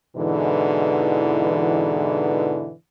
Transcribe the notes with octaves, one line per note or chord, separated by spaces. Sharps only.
G#2 B2 D3 E3